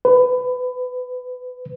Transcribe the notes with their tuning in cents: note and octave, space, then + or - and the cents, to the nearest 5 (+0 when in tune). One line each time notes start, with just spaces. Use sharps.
B4 +20